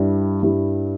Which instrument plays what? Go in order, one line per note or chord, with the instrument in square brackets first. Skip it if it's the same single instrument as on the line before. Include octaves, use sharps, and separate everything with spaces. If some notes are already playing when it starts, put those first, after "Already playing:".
Already playing: [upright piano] G2 G3 E4 G4
G2 G3 E4 G4